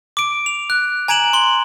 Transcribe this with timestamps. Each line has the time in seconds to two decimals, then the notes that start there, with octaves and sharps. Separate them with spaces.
0.17 D6 D7
0.46 F7
0.70 F#6
1.08 G#5 A#5 G#6 D7 E7 F#7
1.33 C6 F#7 G7